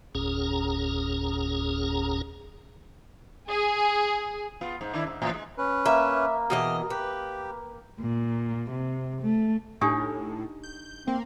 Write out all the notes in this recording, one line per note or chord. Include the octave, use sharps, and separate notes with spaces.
F#1 D#2 A#2 C#4 G#4 A#5
G#4
B3 F4
G#2
D#3 D4 E4
G#2
A2 E3 F3
G#3
C#4 B4
A#3 E5
B2 E3 G#4 D#5 F6
G4 B4
A#2
C3
A3
A2 D4 D#4 G4 G#5
G6
A#3 C4